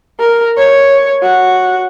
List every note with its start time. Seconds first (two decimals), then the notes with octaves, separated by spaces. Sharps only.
0.20 A#4
0.57 C#5
1.22 F#4